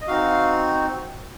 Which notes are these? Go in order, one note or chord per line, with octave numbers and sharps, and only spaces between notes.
D#5
C4 D#4 F#4 F5